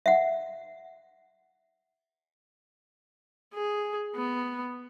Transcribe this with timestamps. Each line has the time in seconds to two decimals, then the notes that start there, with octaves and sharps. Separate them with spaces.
0.06 E5 F#5
3.54 G#4
4.15 B3